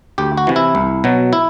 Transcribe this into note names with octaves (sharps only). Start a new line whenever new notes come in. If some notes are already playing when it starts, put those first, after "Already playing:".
D2 G4
F#4
C3 E3
E4
C2
B2 F#3
E4